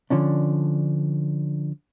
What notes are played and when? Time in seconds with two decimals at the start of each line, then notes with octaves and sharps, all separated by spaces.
0.10 D3 F3 C#4 D4